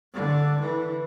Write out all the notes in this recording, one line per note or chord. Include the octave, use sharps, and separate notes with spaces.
D3
E3